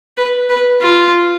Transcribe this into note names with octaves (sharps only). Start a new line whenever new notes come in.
B4
B4
F4